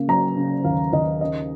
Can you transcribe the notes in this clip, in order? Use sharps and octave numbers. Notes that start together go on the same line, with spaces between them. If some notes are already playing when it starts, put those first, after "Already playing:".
Already playing: C#3 A#3
F#3 A#5
C#3
D#2 F5
D#2 D#5
C#3 D#5